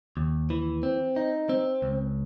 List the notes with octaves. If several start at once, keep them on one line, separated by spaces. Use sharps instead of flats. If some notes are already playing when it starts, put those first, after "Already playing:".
D#2
E3
C4
D#4
C4
C#2